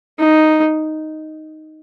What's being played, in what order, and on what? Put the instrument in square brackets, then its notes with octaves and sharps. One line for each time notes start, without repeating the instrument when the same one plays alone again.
[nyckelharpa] D#4